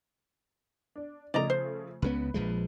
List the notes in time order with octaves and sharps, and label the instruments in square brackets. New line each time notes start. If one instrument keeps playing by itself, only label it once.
[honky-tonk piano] D4
[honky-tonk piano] C#3 F3 A3 [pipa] D5 D#5 A#5
[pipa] C5
[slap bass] C#2 C#3 B3 [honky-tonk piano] B4
[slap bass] A#1 F3 G#3